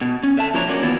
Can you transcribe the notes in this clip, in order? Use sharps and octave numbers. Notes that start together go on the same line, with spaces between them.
B2
C#4
D3 E5 A5
A#2 F3 A#3 D4 C#5 A#5
F#3 A#3 C#4 D5
D#3 E3 F#3 B3 E4 F4